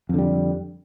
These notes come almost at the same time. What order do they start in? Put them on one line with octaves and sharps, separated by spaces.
F2 D3 G3